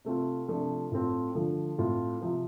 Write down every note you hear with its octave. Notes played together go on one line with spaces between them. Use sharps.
C3 A3 C4 F4
C3 F3 A3 D4 F4
A2 A3 C4 F4
D3 F3 A3
A2 A3 C4 F4
C3 F3 C4